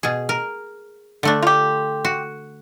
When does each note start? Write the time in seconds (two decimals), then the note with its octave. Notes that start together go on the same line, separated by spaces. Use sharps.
0.03 B2 G#4
0.29 A#4
1.23 D3 A3 D4
1.42 F4 G4
2.05 F#4